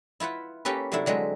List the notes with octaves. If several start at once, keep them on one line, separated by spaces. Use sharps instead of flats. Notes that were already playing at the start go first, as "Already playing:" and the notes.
E4 F4 B4 F#5
A#3 C#4 G4 A4 B4
C3 F#3 A3 D4 E4
D3 F#3 G#3 C4 B4